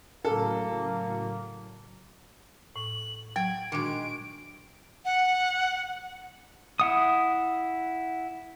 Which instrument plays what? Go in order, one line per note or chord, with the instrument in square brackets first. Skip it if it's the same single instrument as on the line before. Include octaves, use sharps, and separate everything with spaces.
[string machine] A2 C#3 F#3 [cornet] A#3 [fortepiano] A4
[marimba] A2 [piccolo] F#7
[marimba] F#3 [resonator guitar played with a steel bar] G5 [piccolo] G#6
[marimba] A#2 D4 F#4 [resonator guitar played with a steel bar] D#3 G#3 [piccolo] D7
[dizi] F#5
[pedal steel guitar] E4 F#5 D#6